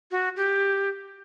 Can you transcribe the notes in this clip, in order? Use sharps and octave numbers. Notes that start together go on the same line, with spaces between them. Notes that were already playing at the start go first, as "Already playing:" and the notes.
F#4
G4